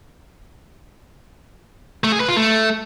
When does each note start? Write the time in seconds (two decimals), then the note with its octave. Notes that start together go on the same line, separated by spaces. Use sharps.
2.04 A3
2.12 G#4
2.20 B4
2.28 F4
2.37 A3